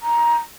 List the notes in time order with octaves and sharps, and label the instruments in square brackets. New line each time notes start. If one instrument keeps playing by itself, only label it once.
[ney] A#5